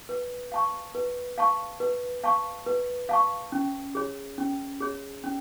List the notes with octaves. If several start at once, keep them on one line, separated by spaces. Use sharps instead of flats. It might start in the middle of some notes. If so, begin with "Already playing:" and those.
B4
F5 A5 C#6
B4
F5 A5 C#6
B4
F5 A5 C#6
B4
F5 A5 C#6
C#4
G#4 C#5
C#4
G#4 C#5
C#4